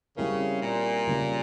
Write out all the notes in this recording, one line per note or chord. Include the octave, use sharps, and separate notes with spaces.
C#3 G3 C4 E4 A#4
A#2
C#3 G3 A#3